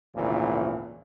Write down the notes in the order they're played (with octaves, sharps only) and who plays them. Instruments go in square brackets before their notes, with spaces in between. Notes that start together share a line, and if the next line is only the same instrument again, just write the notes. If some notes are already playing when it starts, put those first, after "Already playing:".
[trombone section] G#1 D2 A#2 C#3 E3